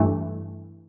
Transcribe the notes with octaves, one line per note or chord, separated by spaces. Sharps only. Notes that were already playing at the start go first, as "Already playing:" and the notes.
Already playing: G2 E3 A3